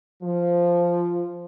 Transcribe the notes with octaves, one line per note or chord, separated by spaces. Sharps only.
F3